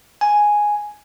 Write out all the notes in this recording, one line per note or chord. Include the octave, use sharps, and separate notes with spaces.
G#5